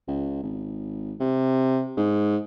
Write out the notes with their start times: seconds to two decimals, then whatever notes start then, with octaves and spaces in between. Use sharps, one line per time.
0.08 C#2
0.43 G#1
1.20 C3
1.97 G#2